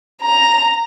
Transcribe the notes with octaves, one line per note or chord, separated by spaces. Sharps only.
A#5